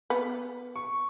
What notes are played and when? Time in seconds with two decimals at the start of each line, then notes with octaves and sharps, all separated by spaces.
0.10 B3
0.76 C#6